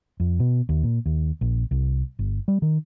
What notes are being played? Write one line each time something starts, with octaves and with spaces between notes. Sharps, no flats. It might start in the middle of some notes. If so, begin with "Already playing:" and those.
F2
B2
D#2
A#2
D#2
A#1
C2
G1
G3
D#3